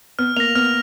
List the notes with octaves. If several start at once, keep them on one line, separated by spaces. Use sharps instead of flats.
B3 F6
A#3 A#6 F7
B3 F6